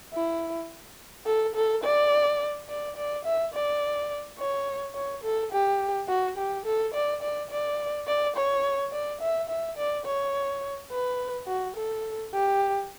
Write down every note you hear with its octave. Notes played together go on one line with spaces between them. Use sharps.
E4
A4
A4
D5
D5
D5
E5
D5
C#5
C#5
A4
G4
F#4
G4
A4
D5
D5
D5
D5
C#5
D5
E5
E5
D5
C#5
B4
F#4
A4
G4